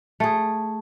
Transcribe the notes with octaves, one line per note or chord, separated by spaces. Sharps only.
A3 G#4